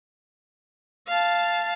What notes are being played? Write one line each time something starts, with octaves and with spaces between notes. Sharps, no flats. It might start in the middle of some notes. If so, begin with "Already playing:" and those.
F5 A5